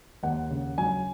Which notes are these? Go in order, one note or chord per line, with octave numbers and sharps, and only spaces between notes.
D#2 F#5
C#3
F#3 G#5